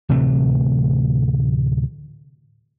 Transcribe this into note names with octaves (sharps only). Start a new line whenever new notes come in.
D1 C3 E3 A3